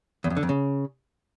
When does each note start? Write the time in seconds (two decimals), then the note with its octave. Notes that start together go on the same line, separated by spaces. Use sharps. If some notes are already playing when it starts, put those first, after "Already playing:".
0.24 E2
0.30 F2
0.37 D3
0.43 F2
0.49 C#3